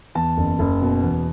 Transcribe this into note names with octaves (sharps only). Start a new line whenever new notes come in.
E2 A5
F#1
F#1
B2
E2